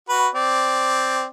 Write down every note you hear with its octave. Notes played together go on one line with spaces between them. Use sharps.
F#4 B4
C4 D5